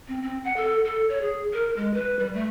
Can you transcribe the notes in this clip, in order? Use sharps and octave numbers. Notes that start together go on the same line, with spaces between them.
C4
C4
F#5
A4
A4
C#5
G#4
A#4
G#3
B4
G3
A3